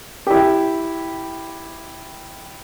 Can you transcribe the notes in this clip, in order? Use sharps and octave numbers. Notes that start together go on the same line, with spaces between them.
E4 G4